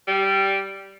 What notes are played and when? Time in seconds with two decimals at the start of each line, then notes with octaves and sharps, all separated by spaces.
0.08 G3